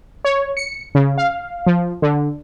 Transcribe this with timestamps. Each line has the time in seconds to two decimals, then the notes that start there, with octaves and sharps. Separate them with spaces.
0.25 C#5
0.57 C#7
0.95 C#3
1.18 F5
1.67 F3
2.02 D3